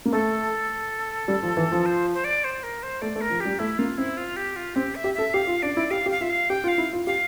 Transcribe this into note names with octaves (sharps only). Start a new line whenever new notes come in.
A#3
A3 A4
G3
F3
E3
F3
C5
C5
D5
C5
A#4
C5
A3 D5
A3
A#4
F3
G3 G4
A3 E4
A#3 F4
C4 E4
F4
G4
F4
C4 G4
E5
G4
A4 E5
G4 F5
F4
D4 D5
E4
G4 F5
G4
F5
F4 E5
F5
G4 G5
F4
F5
E4
F4
G4 F5